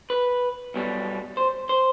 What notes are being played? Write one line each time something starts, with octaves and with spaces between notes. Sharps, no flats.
B4
B1 B2 G3
C5
C5